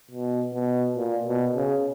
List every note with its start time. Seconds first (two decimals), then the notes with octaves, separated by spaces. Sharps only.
0.11 B2
0.54 B2
0.97 A#2
1.25 B2
1.54 C#3